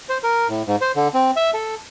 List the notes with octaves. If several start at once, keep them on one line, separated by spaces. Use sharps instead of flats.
C5
A#4
A2
G#2
C5
D3
C4
E5
A4